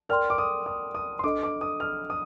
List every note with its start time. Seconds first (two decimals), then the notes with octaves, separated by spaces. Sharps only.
0.09 A#4 D5 G5 C6 F6
0.30 D6
0.38 D#6
0.66 D#6
0.95 D#6
1.19 C6
1.24 D4 A4 D#5 D6
1.43 D6
1.61 D#6
1.80 F6
2.10 D#6